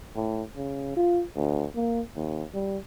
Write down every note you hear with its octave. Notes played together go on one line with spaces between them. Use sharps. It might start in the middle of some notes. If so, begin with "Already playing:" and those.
A2
C#3
F4
D2
A#3
D#2
G3